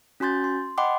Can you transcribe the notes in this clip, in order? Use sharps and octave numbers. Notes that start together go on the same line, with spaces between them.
C#4 F#4 G#5 C6 G6 A6
C6
D#5 F#5 G5 B5 C6 D6